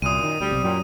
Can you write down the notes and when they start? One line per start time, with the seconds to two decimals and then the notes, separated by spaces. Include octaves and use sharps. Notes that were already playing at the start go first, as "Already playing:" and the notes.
0.02 C2 F#2 A#2 D#6 D#7
0.23 D#3
0.40 D2 G3
0.52 B1 C3
0.63 F#2 A#2 F#3 G3